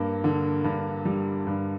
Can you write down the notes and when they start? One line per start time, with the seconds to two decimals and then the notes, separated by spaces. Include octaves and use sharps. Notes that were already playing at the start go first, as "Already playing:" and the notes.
Already playing: G2 A#3
0.24 D3
0.64 G2
1.05 G3
1.47 G2